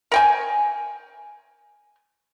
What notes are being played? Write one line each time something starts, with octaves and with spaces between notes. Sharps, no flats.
A#4 G5 G#5